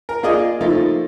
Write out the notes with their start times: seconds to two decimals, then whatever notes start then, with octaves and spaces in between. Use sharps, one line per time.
0.09 A#4
0.23 A#3 F4 G#4 D5 D#5
0.61 F3 A3 A#3 D#4